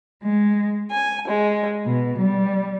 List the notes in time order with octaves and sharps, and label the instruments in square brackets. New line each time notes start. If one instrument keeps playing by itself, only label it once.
[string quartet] G#3
G#5
G#3
B2
G3